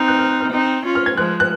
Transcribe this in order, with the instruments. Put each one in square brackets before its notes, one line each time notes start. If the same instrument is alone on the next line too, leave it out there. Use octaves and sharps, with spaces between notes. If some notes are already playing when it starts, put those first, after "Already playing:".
Already playing: [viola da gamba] C4 D#4 [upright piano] F6
[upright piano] F#6
F6
F6
[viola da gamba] C4 D#4
C#4 F4
[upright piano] F6
G#6
[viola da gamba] F3 G#3 [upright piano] F#6
[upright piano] F#6